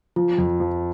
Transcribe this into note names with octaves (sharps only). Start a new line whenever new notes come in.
F3 F4
F2
F3